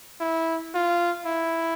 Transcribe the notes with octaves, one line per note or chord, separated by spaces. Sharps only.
E4
F4
E4